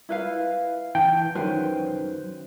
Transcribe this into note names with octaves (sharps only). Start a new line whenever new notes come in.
E4 B4 F5
E3 G5 A5
F#2 D#3 B4 C5